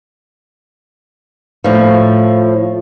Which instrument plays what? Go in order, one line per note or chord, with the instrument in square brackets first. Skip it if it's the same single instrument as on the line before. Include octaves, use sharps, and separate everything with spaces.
[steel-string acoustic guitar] A2 F3